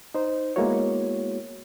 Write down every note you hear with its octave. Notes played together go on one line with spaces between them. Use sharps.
D#4 C5
G#3 A#3 B3 E4 F#4 C#5